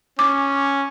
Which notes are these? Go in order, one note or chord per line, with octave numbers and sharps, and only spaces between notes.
C#4 D6